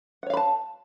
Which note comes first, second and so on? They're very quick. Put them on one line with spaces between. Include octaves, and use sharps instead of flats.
F#5 C#5 F5 B5 A5